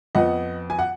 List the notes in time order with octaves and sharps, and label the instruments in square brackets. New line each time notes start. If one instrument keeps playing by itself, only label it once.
[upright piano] F2 F3 B3 D#5 F#5
G#5
F#5